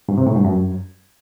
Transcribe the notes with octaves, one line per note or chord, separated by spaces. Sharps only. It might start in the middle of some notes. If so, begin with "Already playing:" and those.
G2
C3
A2
G2
F#2